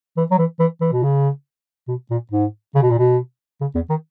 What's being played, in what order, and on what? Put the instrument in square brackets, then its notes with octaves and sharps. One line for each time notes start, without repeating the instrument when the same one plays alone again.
[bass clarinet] E3
F#3
E3
E3
E3
B2
C#3
B2
A#2
G#2
C#3
B2
A#2
B2
C#3
E2
D#3